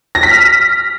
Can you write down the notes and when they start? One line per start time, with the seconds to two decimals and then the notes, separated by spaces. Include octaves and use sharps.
0.15 A#6
0.23 B6
0.31 F6